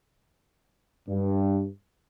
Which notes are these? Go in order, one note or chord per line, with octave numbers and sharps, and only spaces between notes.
G2